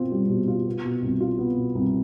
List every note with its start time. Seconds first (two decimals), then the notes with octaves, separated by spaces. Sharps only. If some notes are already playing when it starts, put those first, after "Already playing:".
Already playing: B2 C4 F4
0.12 G3
0.29 B2
0.48 F4
0.67 B3
0.84 B2
1.02 C2
1.20 F4
1.38 B3
1.57 B2
1.75 C2